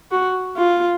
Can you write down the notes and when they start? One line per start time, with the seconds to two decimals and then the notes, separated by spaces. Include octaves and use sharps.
0.11 F#4
0.57 F4